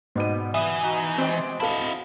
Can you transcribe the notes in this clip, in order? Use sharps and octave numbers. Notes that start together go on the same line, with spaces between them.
G#2 B2 G3 B3 D#7
E3 E5 D#6
D#4 F#4
G#3 C4 G4 D5
E4 A4 D#5 F5 A5